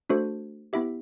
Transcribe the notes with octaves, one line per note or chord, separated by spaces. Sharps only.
A3 D4 F#4 A4 C5
B3 E4 G4 E5